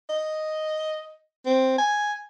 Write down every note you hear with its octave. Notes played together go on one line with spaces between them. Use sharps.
D#5
C4
G#5